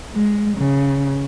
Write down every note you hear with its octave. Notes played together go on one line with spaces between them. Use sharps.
G#3
C#3